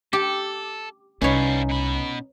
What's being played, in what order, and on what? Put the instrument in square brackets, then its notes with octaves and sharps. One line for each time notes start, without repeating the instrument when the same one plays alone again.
[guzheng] G4 [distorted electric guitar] A4
[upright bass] C2 [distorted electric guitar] G3 F5 [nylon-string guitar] C#4 D#4 [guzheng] B4 C#5
[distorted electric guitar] B2 B5